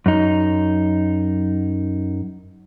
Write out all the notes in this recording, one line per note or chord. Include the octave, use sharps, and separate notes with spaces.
F#2 D#4